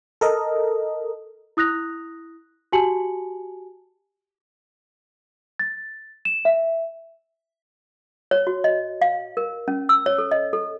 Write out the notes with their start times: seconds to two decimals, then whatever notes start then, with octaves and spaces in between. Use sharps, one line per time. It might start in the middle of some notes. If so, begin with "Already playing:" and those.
0.21 A4 A#4 D#5
1.57 E4 D#6 F#6 A#6 F7
2.72 F#4 G4 G#5 A5 C#7 F#7
5.59 A6
6.25 E7
6.45 E5
8.31 C#5
8.47 F#4
8.64 D#5
9.02 F5
9.37 A#4
9.68 C#4
9.89 E6
10.06 C#5
10.18 A4
10.31 D#5
10.53 A4